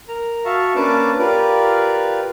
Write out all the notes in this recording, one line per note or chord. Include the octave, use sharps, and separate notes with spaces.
A#4 A#5
F#4 E5 F5 A5 C#6
A#3 C#4 D4 B4 A5 D6
F4 G4 A#4 B4 D5